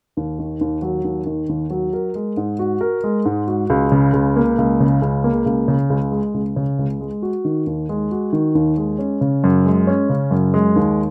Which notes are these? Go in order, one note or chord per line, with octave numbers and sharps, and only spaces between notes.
D#2
D#3
D#2
F#3
D#2
D#3
D#2
F#3
A#4
G#3
G#2
F#4
A#4
G#3
G#2
F#4
C#2
C#3
C#2
A#3
C#2
C#3
C#2
A#3
C#2
C#3
C#2
G#3
C#2
C#3
C#2
G#3
F#4
D#3
D#2
G#3
F#4
D#3
D#2
G#3
C#4
C#3
F#2
G#3
C#4
C#3
F#2
G#3
D#2